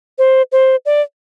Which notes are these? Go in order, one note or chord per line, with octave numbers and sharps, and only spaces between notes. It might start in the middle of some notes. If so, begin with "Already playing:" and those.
C5
C5
D5